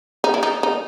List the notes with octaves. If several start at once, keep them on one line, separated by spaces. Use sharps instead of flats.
D#4
E4
D#4
D#4